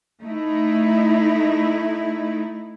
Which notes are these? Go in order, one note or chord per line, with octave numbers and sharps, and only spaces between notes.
A3 D#4 E4